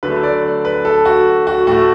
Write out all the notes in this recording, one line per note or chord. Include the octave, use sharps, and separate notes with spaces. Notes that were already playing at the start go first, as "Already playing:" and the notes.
D3 F#3 A3 B4
D5
B4
A4
F#4
F#4
A2 A3 F#4